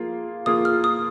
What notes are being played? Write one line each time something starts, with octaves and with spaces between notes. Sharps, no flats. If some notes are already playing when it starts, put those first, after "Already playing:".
Already playing: F3 A#3 F4 G#4
F3 A#3 F4 G#4 D#6
F6
D#6